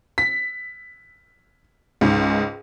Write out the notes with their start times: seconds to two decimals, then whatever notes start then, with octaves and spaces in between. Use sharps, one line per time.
0.18 B6
2.01 C#2 G#2